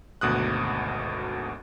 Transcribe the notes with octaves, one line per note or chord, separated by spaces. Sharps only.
G#1 D2 B2 D#6 F#6